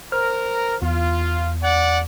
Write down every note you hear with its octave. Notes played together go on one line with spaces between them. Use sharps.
A#4 C5 F6
E2 F4
D5 F#5